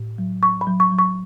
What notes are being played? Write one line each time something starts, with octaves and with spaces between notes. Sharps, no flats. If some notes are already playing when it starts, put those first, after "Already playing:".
Already playing: A2
F#3
F#3 C#6
B5
F#3
C#6
F#3
C#6